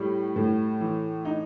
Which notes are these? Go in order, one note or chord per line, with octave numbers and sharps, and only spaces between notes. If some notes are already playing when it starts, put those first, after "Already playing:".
Already playing: A2 G3
A2
E3
D#4